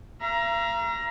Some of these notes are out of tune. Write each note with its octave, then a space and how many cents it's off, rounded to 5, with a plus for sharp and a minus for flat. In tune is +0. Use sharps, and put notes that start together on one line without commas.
F5 -45 A#5 +15